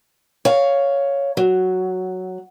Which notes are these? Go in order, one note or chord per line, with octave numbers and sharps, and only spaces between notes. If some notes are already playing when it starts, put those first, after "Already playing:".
C#5 F5
F#3